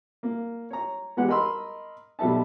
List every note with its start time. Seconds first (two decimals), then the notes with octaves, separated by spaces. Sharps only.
0.23 A#3
0.71 C#5 A#5
1.17 E2 G#3 B3 G4 F#5
1.28 A#4 D#5 B5 C6 E6
2.19 B1 G3 A4 E5 A5